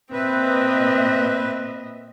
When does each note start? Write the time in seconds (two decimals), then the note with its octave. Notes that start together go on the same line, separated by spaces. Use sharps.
0.12 A#2 C4 B4 D#5 E5